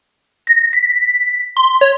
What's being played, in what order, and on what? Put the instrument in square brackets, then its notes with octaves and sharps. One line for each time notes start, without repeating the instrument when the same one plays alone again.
[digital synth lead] A#6
B6
C6
C#5